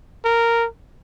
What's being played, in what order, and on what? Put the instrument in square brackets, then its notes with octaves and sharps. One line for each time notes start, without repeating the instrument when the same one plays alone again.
[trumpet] A#4